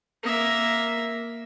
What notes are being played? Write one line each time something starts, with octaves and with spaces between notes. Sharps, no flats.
A#3 E5